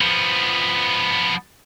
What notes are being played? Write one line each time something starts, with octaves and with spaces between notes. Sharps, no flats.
F3 B3